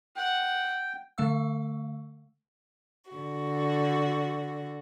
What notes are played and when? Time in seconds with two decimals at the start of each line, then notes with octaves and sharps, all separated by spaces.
0.16 F#5 G5
1.18 D3 A3 F5 E6
3.10 D3 F#4